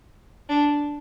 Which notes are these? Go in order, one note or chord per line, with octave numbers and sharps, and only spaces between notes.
D4